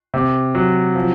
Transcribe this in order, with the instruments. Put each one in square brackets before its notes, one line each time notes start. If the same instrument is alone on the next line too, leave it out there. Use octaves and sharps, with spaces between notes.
[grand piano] C3
F#3
F3